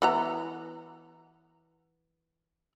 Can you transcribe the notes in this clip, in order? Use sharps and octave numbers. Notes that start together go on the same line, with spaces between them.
E3 B3 A#5